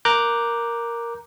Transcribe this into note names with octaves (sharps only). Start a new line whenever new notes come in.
A#4 A#5 D6 F#6 G6